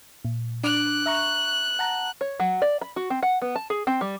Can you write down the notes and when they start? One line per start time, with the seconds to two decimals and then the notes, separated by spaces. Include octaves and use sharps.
0.25 A#2
0.64 D4 D6 F#6 D7
1.06 E5 A#5 C#6
1.79 F#5 A5 A#5
2.21 C#5
2.40 F#3
2.62 D5
2.81 B5
2.96 F#4
3.10 C4
3.23 F#5
3.42 B3
3.56 A5
3.70 G#4
3.87 C4
4.01 G3